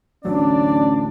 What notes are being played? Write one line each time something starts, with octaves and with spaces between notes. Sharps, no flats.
D1 A1 F#3 C#4 D4 D5